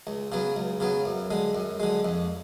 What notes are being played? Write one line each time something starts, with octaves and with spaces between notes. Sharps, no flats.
C#2
C#3 F#3 B3
C#2
C#3 F#3 B3
F#2
D3 G#3
F#2
D3 G#3
F2